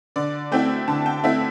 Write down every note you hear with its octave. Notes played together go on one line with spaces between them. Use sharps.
D3 D5
A3 C4 E4 G5
D3 A5
G5
A3 C4 E4 E5